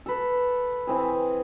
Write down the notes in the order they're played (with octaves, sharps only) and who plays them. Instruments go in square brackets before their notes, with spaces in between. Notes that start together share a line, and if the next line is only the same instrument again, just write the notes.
[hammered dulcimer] A4 B4
E3 C4 G#4